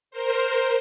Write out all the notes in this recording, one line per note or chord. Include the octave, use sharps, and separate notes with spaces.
A#4 C5